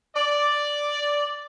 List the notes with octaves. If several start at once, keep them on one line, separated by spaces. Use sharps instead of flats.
D5